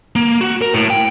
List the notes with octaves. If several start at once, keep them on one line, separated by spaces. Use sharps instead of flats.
A#3
F#4
A#4
A2
G5